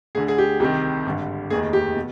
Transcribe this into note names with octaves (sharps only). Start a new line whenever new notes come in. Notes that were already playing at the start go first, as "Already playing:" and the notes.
D2 D3 G#4
G#4
G4
C2 C3 D#3 G4
G#1 G2 D3
F1 D#2 D#3 G#4
G4
B2